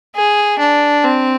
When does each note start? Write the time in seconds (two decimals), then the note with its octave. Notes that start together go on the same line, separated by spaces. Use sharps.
0.16 G#4
0.59 D4
1.04 C4